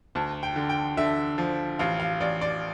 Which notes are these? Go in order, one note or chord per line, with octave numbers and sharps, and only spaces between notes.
D2 A5
G5
D3
G5
D3 E5
F3
A1 F5
F5
A1 D5
D5